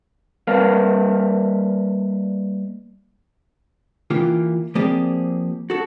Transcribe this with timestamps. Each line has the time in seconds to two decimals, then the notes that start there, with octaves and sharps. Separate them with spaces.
0.47 G3 A#3 A#4 B4 F5
4.10 E3 A#3 F4 G4
4.75 F3 A#3 C4 G4 G#4 D5
5.70 F#4 A4